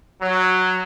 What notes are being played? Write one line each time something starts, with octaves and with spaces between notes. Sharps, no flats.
F#3